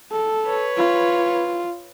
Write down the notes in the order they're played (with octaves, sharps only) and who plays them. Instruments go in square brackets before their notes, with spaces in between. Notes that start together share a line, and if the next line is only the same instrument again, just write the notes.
[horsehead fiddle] A4
[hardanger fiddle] B4 C#5
[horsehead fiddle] F4